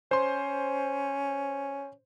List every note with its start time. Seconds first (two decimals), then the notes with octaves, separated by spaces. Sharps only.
0.11 C#4 C5 C6